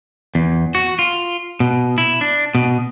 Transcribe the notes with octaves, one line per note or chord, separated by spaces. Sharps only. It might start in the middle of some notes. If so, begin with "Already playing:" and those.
E2
F#4
F4
B2
E4
D4
B2